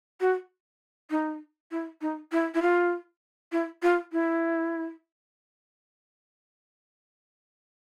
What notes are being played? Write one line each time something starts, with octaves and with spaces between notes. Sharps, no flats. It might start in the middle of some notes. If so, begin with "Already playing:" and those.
F#4
D#4
E4
D#4
E4
E4
F4
E4
F4
E4